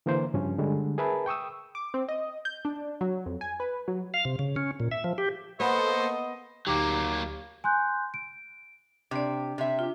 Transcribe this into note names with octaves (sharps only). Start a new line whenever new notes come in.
D3 E3 A#3 A#4 C5
G2 C#3 F3 C#4
D3 G3 G#3
G#4 A#4 B4 E5 A5 B5
G5 C#6 D#6 E6
D6
C4
D#5
G6
D4
F#3
F2
G#5
B4
F#3
F5
C3
C#3
C#4
A#2
E5
F3
G4
A#3 B3 A4 C5 D#5 C#6
D2 F#3 A#3 D#4 G4 A#5 D6
G#5 C6 F#6 G6
D7
C3 D4 D5
C3 E5
D4 F4